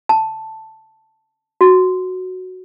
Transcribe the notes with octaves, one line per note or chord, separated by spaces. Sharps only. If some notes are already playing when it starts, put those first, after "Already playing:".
A5
F#4